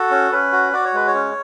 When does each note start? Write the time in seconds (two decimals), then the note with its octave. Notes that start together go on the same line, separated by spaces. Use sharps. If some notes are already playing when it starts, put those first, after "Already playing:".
Already playing: F#4 A4
0.11 C#4
0.32 C#4 B4
0.52 F#4
0.73 F#4 D5
0.85 C#5
0.93 G#3 B4
1.07 C#5
1.14 C#4